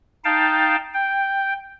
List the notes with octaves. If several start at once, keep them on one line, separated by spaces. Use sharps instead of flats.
D#4 F5 G5 A5
G5